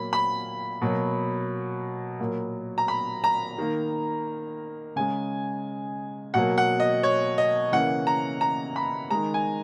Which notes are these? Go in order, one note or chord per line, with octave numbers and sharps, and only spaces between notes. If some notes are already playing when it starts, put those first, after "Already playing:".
Already playing: A#2 F#3 A#3 B5
B5
B2 F#3 A#3
A#2 F#3 A#3
A#5
B5
A#5
D#3 A#3
C#3 G#3 G#5
B2 F#3 A#3 F#5
F#5
D#5
C#5
D#5
C#3 E3 A#3 F#5
A#5
A#5
B5
D#3 G#3 A#5
G#5